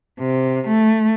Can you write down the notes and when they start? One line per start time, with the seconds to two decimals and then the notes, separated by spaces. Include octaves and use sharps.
0.20 C3
0.67 A3